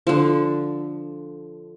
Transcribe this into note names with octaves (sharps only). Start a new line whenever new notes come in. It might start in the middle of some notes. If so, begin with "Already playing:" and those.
D3 F3